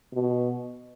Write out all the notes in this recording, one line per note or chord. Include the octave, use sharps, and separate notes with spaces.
B2